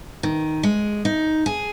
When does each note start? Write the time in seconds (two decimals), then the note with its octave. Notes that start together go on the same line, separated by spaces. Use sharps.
0.23 D#3
0.63 G#3
1.05 D#4
1.46 G#4